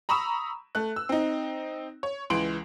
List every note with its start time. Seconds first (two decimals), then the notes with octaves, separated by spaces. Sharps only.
0.09 A#5 B5 C#6 D#6 E6 E7
0.75 A3 F#6
0.96 E6
1.09 C4 D#4
2.03 C#5
2.30 C#2 E3 C6 D7 F#7